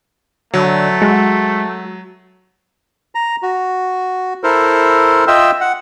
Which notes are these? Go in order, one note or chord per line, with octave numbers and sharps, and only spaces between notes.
D3 F#3 A3
G#3 F#4
A#5
F#4
E4 A4 A#4 C5
F4 D#5 E5 G5 E6
F#5